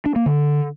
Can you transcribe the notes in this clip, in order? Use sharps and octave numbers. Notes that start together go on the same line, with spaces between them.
D4
A#3
D3